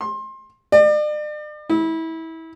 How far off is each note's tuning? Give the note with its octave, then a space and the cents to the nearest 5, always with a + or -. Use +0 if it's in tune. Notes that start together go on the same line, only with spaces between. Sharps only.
C6 +25
D5 +40
E4 -25